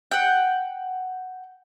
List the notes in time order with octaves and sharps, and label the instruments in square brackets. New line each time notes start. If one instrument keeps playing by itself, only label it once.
[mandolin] F#5 G5